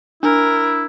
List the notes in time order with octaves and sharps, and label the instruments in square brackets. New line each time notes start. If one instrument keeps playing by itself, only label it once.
[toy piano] D4 [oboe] E4 [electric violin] A#4